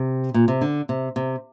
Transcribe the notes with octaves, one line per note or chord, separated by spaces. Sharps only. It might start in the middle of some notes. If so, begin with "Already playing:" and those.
Already playing: C3
A#2
C3
D3
C3
C3